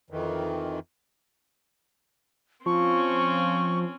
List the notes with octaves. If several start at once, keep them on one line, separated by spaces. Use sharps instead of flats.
F2 D#3 E3
F3 C4 C#4 C#6